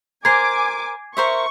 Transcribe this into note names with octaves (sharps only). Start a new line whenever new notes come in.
A#4 C5 G#5 D6 G#6 C7
A#4 C5 E5 C#6